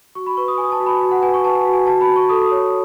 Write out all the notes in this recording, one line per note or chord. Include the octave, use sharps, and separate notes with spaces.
F#4 C#6
B5
B4 C#6
D#6
B4 G#5
A5
F#4
B5
F#4
F#5
B4 G#5
C#6
B4 A5
F#4
G#5
F#4 A5
B5
F#4
C#6
A4 D#6
C#5